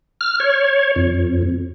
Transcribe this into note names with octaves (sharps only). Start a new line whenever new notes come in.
F6
C#5
F2